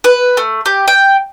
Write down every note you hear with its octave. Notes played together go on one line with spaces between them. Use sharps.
B4
A3
G4
G5